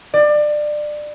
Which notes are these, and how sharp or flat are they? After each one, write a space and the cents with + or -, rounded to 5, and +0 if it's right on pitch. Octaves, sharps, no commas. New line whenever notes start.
D5 +25